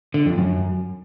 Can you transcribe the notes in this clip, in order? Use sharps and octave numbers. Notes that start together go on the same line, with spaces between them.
D3
F2
F#2